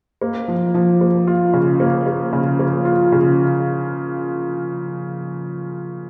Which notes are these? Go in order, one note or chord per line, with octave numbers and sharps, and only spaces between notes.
A#3
F3
F3
A#3
F4
C#3
A#3
A#3
C#3
A#3
F4
C#3